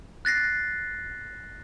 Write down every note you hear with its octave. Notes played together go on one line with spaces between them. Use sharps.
F#6 A6 A#6 C7